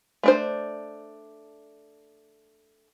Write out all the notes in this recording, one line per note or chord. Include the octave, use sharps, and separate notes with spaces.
A3 D4 C5